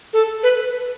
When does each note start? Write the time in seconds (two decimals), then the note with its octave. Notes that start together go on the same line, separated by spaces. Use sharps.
0.13 A4
0.43 B4